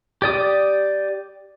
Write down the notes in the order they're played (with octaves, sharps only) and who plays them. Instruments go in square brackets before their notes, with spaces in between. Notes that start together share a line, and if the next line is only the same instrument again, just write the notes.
[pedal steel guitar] G4 D5 D#6